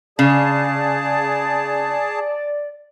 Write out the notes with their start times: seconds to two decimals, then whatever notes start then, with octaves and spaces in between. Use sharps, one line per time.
0.19 C#3 G#4 D5 A5